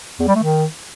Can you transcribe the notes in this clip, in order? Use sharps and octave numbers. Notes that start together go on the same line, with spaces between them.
E2
G3
A3
D#3